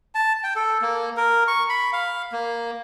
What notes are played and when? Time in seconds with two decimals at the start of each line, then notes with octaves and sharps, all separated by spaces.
0.15 A5
0.43 G5
0.56 A4
0.81 A#3
1.17 A#4
1.48 C#6
1.70 B5
1.93 F5
2.32 A#3